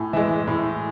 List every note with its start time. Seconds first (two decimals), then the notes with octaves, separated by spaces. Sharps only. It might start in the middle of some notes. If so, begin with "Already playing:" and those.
Already playing: A2 G#5
0.13 E3 G#3 E5
0.47 A2